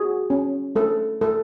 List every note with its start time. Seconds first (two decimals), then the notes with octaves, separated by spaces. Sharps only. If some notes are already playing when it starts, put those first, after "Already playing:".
Already playing: F#4 G#4
0.30 C#4
0.76 A3 A4
1.21 A3 A4